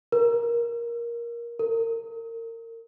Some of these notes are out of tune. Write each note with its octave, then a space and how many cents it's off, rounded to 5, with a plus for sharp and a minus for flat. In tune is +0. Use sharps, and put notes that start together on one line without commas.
A#4 +15
A#4 -30